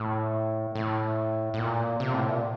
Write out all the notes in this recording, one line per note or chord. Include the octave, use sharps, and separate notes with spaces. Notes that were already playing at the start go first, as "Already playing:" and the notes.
Already playing: A2
A2
A2
A#2
C3
A2
A#2